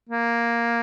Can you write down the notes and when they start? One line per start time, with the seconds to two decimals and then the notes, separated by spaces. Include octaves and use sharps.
0.09 A#3